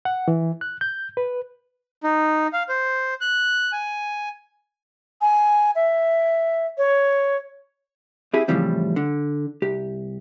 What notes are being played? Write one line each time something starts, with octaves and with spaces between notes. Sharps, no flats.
F#5
E3
F#6
G6
B4
D#4
F5
C5
F#6
G#5
G#5
E5
C#5
C4 E4 G4 G#4
A2 C#3 E3 F3 G3 C4
D3
C2 G4